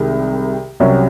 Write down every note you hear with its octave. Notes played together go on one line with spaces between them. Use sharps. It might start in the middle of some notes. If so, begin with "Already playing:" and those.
Already playing: C2 C3 D#3 G#3
C2 C3 F#3 C#4